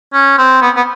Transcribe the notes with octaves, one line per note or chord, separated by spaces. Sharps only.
C#4
C4
B3
B3